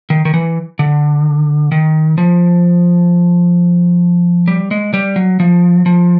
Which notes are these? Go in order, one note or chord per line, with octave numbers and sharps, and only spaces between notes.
D#3
D#3
E3
D3
D#3
F3
G3
G#3
G3
F#3
F3
F3